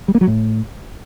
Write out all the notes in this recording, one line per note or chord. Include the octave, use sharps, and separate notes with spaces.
G3
A#3
F#3
A2